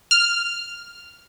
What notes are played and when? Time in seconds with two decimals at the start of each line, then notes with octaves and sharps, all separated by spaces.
0.11 F6